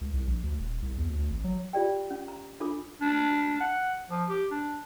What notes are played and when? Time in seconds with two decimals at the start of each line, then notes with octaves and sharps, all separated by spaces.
0.01 C#2
0.14 C2
0.28 A#1
0.43 D2
0.59 D#1
0.82 C2
0.98 E2
1.10 D2
1.30 G#1
1.44 F#3
1.73 F4 G4 D5 G5
2.11 C#4
2.28 A#5
2.60 D4 F4 A4 B5 D6
3.01 D4
3.60 F#5
4.10 F3
4.29 G4
4.51 D4